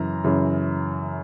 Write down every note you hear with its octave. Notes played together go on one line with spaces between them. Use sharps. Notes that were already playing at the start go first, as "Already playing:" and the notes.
Already playing: F#2 C#3 E3 A#5
F#2 C#3 E3